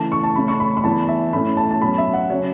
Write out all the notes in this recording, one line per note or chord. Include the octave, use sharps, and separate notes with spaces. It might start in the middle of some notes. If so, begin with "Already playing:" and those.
Already playing: C#3 E3 A3 A5
C#6
A5
C#3 A3 C#4 B5
C#6
B5
B5
E2 E3 B3 A5
E5
A2 A3 C#4 B5
A5
A5
B2 F#3 C#4 B5
E5
F#5
C#3 F#3 C#5